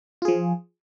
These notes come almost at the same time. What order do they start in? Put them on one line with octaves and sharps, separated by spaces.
F4 G#4 F3